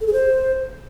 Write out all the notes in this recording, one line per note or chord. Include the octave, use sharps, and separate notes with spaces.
A4
G#4
C5